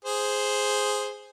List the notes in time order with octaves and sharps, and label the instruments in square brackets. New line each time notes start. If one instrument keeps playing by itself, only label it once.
[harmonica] G#4 C5